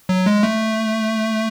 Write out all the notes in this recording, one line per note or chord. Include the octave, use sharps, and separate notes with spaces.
F#3
G#3
A3